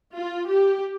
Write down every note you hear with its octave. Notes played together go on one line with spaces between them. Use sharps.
F4
G4